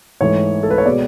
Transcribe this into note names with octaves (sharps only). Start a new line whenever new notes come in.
G#2 E3 A3 C#5
A4
B4
C#5
B2 G#3 D5